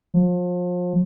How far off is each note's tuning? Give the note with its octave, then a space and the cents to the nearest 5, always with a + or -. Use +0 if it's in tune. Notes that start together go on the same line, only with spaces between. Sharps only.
F3 +35